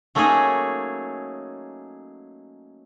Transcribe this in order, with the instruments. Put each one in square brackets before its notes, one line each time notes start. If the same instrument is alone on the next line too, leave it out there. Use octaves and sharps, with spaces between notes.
[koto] F#3 A3 A#3 C#4 D#4 G#4